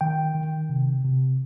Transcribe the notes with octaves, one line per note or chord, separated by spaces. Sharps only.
D#3 G5
D#3
C3
C3